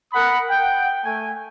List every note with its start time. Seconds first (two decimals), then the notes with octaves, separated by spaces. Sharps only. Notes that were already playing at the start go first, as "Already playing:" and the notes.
0.13 A#4 F#5 B5 D#6
0.51 F#5 G5
1.05 A3 G#5